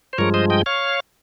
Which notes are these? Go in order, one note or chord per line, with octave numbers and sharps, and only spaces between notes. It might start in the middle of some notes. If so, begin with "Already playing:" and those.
C5
G2 F3 G#3 A#4 C#5
C5 D#5
D#5 G5
C#5 F5